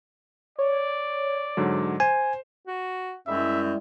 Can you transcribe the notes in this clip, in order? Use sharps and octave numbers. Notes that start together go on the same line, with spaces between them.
C#5 D5
G#2 D3 F#3
C5 G#5
F#4
F#2 G3 G#3 E4 E5